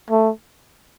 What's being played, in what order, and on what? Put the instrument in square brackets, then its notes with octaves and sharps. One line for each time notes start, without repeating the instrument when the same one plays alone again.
[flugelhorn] A3